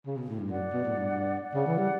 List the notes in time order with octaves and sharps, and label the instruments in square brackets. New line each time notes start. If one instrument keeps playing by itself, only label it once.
[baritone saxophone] C#3
B2
A2
G2
[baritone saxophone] F#2 [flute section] D5 F#5
[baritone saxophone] B2
A2
G2
[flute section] D5 F#5
[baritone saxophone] C#3
E3
G3